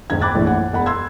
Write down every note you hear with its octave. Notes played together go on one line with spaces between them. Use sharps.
D#1 G#1 D#3 G#6
G5 B5 D6 F#6 A6
A#1 A2 E3
F#5
E1 F#5 B5
C6 E6 G#6